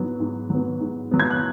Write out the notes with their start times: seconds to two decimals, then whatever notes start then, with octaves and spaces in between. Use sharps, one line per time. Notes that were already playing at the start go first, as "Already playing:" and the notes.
Already playing: G#2 F#3 B3
0.20 G#2
0.50 F#3 B3
0.80 G#2
1.11 F#3 B3
1.20 G#6
1.31 F#6